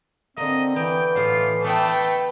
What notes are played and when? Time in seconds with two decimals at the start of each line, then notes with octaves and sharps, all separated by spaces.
0.37 D3 A#3 C4 D#5
0.76 E3 B3 G5
1.16 A2 F4 C7
1.64 A3 B3 E4 G5 A5